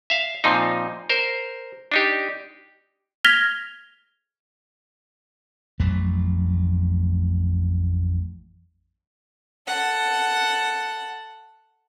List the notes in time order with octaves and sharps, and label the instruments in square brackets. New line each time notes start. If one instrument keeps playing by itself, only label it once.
[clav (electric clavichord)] E5 F5
A#2 F3 C4 D#4
A#4 C5
D4 D#4 G4
[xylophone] F6 G#6 A#6 B6 F7 G7
[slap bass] A1 F2 F#3 A3
[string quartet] A4 F#5